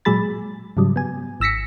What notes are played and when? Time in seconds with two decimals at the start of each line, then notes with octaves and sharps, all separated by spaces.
0.05 A#2 F#3 G#3 G#4 B5 A6
0.77 G#2 C#3 F#3 G3
0.96 B3 G#5
1.40 G#1 E6 A#6 B6 C#7